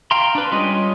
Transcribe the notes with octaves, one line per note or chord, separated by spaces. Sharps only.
F5 G5 A#5 C6
D4 B4
G3 G#3 C#4 F4 D#5